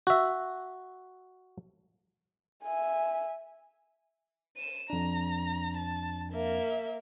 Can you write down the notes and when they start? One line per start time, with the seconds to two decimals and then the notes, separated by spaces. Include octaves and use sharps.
0.07 F#4 E5
2.64 E5 G#5
4.57 D#7 E7
4.90 F2 D4 A#5
5.77 A5
6.32 A#3 E5